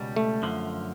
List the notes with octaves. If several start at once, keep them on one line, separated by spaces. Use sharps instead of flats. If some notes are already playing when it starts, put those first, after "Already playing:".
Already playing: C#2 B2 G3
A3
F#2 D3 F3